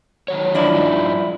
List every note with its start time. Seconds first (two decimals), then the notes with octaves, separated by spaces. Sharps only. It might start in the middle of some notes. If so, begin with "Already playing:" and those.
0.28 D#3 F#3 C#5
0.55 F3 D4 E4
0.74 G2 D#4